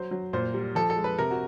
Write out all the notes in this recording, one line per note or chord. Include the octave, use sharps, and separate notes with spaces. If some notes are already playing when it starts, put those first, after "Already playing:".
Already playing: F#3 C5
F#3
A#2 C5
G3
F3 A4
A4
G#3
B4
C3 A#4
F#4